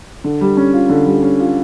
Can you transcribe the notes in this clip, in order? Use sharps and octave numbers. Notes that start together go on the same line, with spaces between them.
D3
G3
C#4
F4
D3
G3
C#4
F4